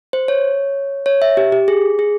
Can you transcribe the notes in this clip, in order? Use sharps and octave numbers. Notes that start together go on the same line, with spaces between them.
C5
C#5
C#5
E5
G4
G4
G#4
G#4